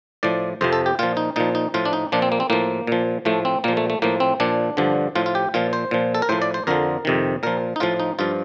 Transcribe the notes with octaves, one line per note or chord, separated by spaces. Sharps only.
A2 F3 D5
F2 C3 F3 C5
A4
G4
A#2 F3 F4
D#4
A#2 F3 D#4
D#4
A2 F3 F4
D4
D#4
A#2 F3 D4
C4
A#3
C4
A2 F3 A#3
A#2 F3
A2 F3 A3
C4
A#2 F3 A#3
A3
A3
A2 F3 A#3
C4
A#2 F3 D4
G2 D3 F3
A2 F3 F4
F4
G4
A#2 F3 F4
C5
A#2 F3
A4
A#4
A2 F3 C5
D5
C5
F2 D3 F3 A#4
F2 C3 D#3
A#2 F3 A#4
D#4
A2 F3 F4
D#4
G2 F3 F4